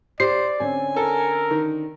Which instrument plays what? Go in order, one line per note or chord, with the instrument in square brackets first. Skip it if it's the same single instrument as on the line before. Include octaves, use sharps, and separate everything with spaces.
[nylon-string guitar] G4 [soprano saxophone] C5 [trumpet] D5 [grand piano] C7
[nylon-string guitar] D3 C4 C#4 [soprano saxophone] G#5
[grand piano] A4 [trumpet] A#4
[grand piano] D#3